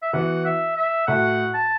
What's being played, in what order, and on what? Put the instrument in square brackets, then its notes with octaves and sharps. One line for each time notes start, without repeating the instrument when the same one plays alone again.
[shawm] E5
[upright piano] E3 B3 F#4 [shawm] F#5
[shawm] E5
E5
[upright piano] A2 A3 F#4 [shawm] F#5
[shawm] A5